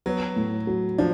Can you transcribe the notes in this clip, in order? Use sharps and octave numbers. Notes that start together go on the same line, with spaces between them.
F#3 B3
A2
F#3
F3 D4